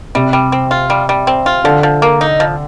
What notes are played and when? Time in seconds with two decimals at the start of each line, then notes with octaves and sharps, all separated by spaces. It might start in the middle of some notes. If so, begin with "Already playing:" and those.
0.15 C3 G3
0.33 G3
0.52 C4
0.71 F4
0.90 G3
1.09 G3
1.27 C4
1.46 F4
1.64 D3 F3
1.83 F3
2.02 A#3
2.21 D#4
2.40 F3